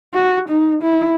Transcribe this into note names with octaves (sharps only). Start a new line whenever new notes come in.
F#4
D#4
E4